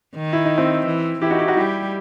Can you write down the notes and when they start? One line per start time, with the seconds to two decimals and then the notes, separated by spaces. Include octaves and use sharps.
0.15 D#3
0.33 E4
0.45 D#4
0.58 C4 E4
0.86 E3
1.21 E3 E4 G4
1.30 D#4 F#4
1.39 E4 G4
1.48 D#4 F#4
1.57 G3 E4 G4